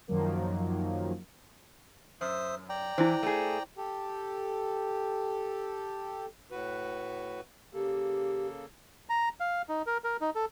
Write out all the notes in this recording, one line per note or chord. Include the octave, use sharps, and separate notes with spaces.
F#2 D#3 F3 F#3 A#3
F#2 C5 E5 D#6
D5 G5 A#5
E3 E4 C5
A3 G#4
G4 A4
A2 F#4 B4
C#3 A#3 G4 A4
A#5
F5
D#4
A#4
A#4
D#4
A4